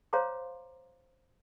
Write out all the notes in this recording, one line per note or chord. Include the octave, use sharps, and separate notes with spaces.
C5 C#5 F5 A#5 C6 D6